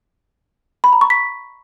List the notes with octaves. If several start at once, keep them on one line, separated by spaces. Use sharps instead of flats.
B5
A#5
C#6
B6